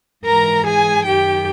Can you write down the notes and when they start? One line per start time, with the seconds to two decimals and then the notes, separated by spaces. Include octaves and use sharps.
0.25 G#2 E3 A#4 A#5
0.65 G#4 G#5
1.05 F#2 D#3 G4 G5